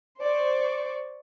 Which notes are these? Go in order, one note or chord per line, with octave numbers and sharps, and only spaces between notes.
C5 D5 C#6